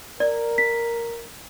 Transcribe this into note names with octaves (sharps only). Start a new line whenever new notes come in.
A#4 D5
B6